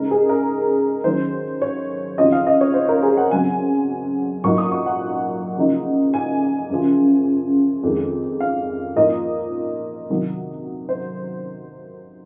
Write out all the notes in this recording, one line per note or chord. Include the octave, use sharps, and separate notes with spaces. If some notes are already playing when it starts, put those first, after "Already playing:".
Already playing: C#3 G#3 D#4 A#4
G#4
A#4
D#3 F#3 C#4 C5
C#5
C#3 F3 C4 D#4 D#5
F5
D#5
C#5
C5
A#4
G#4
F#5
C#3 F#3 C4 G#5
A#2 F#3 A#3 D#4 C#6
D#6
C#6
F#5
C#3 F3 A#3 D#4
G#5
F#2 C#3 F3
F2 D#3 G#3
F5
A#2 F3 A#3 D#4 D#5
C3 D#3 F#3
C5